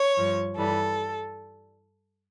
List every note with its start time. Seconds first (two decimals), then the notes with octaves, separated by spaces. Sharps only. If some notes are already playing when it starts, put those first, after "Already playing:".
Already playing: C#5
0.16 G2 F3
0.56 G2 E3 G3 A4